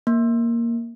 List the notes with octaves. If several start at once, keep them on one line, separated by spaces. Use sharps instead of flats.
A#3